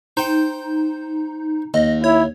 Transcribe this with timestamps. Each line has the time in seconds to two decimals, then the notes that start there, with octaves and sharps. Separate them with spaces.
0.17 D#4 C5 G5
1.74 D#2 D#5
2.04 E4 C#5